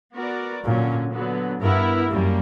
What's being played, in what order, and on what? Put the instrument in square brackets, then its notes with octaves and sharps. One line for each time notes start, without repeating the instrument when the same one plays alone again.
[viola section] B3 F#4 A#4 D5
[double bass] A#2 [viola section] D3 F#3 C#4
[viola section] D3 F#3 B3
[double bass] G2 [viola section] B3 E4 A#4
[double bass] F#2 [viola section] G3 A#3